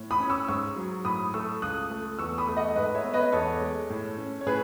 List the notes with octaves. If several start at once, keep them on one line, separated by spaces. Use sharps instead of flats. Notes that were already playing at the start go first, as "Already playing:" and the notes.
Already playing: A2
B5 D#6
C#4
C#6 E6
G#2 C#6 E6
F#3
A2 B5 D#6
A3 C#6 E6
C#2 D#6 F#6
A3
E2 C#6 E6
B5 D#6
A3
D#5 F#5
G#2 B4 D#5
C#5 E5
B3
B4 D#5
E2 A4 C#5
G#3
A2
C#4
C#5
A2 G#4 B4